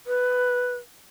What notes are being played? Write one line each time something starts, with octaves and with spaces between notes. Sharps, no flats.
B4